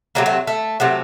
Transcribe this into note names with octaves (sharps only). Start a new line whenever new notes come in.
C3 F#3 A3 A#3
A3
A3
C3 F#3 A3